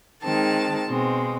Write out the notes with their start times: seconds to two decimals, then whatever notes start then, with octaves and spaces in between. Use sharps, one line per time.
0.23 D#3 G#3 C4 A5
0.88 B2 G#3 C4